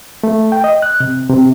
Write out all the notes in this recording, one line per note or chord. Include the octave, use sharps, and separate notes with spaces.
A3
G5
D#5
F#6
C3
C3